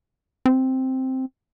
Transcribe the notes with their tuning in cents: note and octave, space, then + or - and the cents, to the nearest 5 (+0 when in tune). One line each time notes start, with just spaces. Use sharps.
C4 +0